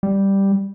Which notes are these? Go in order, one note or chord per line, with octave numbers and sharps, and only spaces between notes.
G3